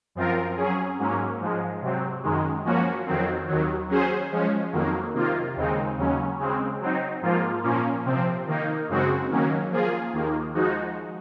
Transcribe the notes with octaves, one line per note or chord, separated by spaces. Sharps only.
F#2 F3 C4 F4 A#4
F#3 C#4 G#4
G#2 F#3 A#3 C#4
G#2 F3 G#3
C3 F#3 C4
F#2 D#3 G#3
F3 A#3 C#4 F#4
F2 D#3 F#3 C4
D#2 D#3 F#3
F#3 C#4 G#4 C5
F3 G#3 C#4
F2 D#3 F#3 A#3
C3 D#3 A#3 F4
D#2 C#3 G#3 C4 D#4
D#2 C#3 F#3 C#4
C#3 G#3 C4
F#3 C4 D#4
G#2 F3 A#3 F4
A#2 F3 A#3 C#4
C3 F3 C4
D#3 A#3 D#4
F#2 C#3 G#3 C4 F#4
D#3 F#3 A#3 C#4
F3 A#3 F4 G#4
D#2 D#3 A#3
F3 G#3 D#4 F#4